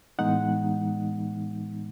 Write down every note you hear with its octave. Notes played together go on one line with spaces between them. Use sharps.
A2 E3 G#3 B3 D#4 F#5